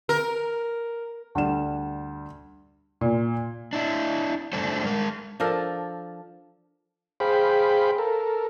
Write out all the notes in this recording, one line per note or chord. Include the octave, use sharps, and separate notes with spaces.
A#4
D2 G3 E7
A#2
D4 E4
A2 G3 D4 A4 C5
G#3 A#4
F3 D4 A4 A#4
G#4 C5 F5 G5 B5
A4 A#4